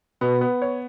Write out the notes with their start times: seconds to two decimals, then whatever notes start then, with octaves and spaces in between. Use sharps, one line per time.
0.21 B2 B3
0.41 B3
0.62 C#5